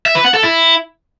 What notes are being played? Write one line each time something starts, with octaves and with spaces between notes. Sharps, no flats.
E5
B4
F#5
A4
E4